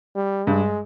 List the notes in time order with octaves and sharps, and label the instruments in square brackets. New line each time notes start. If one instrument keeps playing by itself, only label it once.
[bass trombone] G3
[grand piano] G2 [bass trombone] G#3